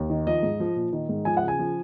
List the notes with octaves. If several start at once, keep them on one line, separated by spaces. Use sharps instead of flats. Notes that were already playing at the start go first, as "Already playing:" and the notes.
Already playing: D#2
D#3
F3 D#5
G#2
F3
A#2
D#3
G#2
F3 G#5
F#5
C#3
G#5
F3